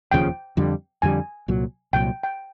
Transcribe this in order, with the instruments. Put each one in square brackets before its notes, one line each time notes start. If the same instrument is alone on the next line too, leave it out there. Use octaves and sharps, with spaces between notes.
[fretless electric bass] E1 D#2 C#3 F3 [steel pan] G5
[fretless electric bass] F2 D3 G3
[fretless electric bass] F2 D3 G3 [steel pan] G#5
[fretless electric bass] C2 A#2 F#3
[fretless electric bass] C2 A#2 F#3 [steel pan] G5
[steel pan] G5